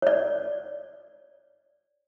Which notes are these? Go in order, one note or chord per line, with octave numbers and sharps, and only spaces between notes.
C#5 D5